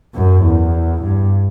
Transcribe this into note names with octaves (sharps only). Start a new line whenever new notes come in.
F#2
E2
G2